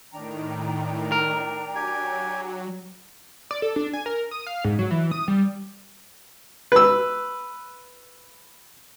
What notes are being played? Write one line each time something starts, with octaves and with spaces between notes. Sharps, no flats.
A2 D#3 D4 G5 A#5
A#4
F#3 G4 G#5
D5
A4
D4
G#5
A#4
D#6
F5
G#2
F#3
E3
D#6
G3
B4 E6